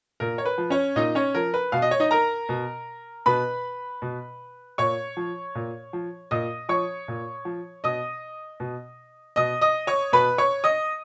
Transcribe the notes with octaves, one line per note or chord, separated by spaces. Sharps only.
A#2 A#4
C#5
B4
F3
C#4 C#5
A#2 D#4 D#5
C#4 C#5
F3 A#4
B4
B2 F5
D#5
C#5
D#4 D#5
A#4 A#5
B2
B2 B4 B5
B2
A#2 C#5 C#6
F3
A#2
F3
A#2 D#5 D#6
F3 C#5 C#6
A#2
F3
B2 D#5 D#6
B2
B2 D#5 D#6
D#5 D#6
C#5 C#6
B2 B4 B5
C#5 C#6
D#5 D#6